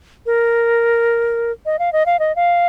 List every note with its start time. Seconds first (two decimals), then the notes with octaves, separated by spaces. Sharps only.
0.26 A#4
1.66 D#5
1.79 F5
1.93 D#5
2.06 F5
2.19 D#5
2.36 F5